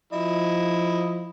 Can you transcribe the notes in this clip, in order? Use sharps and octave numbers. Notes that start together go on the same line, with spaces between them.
F3 E4 D#5